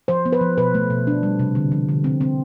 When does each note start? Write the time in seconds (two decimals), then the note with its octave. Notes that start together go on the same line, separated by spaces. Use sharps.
0.08 F3 C5
0.26 B3
0.33 B4
0.41 F3
0.58 B2 B4
0.74 A3
0.90 B2
1.07 D4
1.23 G3
1.39 C3
1.55 D3
1.72 F3
1.89 D3
2.04 C4
2.21 C4